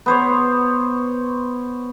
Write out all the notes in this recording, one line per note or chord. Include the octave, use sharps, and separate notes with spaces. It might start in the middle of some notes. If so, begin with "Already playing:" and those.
B3 C5 C#5